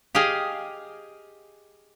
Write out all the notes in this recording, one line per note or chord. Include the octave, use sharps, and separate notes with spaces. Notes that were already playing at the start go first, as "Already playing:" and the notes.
G4 G#4 D#5 F5 G#5